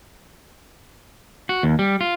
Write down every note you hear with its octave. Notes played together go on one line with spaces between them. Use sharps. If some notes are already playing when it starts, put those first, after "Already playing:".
F#4
D#2
G3
F4